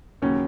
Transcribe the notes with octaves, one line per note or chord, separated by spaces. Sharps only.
D#2 C#3 F#3 C#4